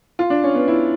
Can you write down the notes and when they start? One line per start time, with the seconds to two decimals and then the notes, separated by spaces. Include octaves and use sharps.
0.19 F4
0.30 D4
0.44 C#4
0.55 B3
0.68 E4